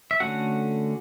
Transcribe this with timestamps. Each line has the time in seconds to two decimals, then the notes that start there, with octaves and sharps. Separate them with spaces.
0.11 E5
0.20 D3 A3 C#4 F#4 F#5